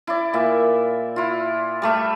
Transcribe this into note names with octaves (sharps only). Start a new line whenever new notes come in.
E4 D5
A#2 E5
E4 F4
G3 A3 E5